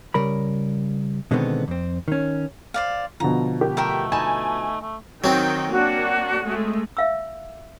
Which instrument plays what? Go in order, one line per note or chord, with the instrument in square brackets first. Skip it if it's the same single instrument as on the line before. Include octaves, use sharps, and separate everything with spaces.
[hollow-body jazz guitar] C#3 G3 A#4 B5
B2 D3 D#3 G#3 B3 C4
F2 C4
D#3 C#4
[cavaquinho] C5 D5 F5
[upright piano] B2 D3 F3 [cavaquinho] A#5
[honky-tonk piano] G4
[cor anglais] A3 [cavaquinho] A#4 E5 G5
[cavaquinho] D#4 A5 B5 [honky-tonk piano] G#5
[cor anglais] A3
[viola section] D#3 G5 [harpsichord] F#3 C4
[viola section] A#3 D4 [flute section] F#4
[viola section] G#3 A3
[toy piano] E5 F5 E6